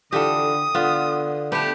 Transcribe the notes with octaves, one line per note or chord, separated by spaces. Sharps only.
D3 E3 F4 G4 A4 D#6
D3 B3 F4
A3 B3 D4 G4